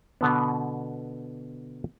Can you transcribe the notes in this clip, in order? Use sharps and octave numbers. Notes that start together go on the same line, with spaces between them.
B2 D3 B3